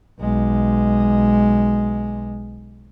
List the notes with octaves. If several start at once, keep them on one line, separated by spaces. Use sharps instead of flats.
B1 G#3